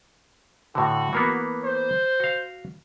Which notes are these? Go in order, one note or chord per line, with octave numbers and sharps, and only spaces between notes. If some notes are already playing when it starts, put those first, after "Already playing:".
A2 D3 F#4
E3 A#3 B3
C5
F#4 F5